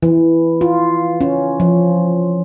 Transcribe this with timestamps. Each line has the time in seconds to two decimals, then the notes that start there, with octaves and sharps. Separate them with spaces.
0.03 E3
0.61 F4
1.21 C#4
1.60 F3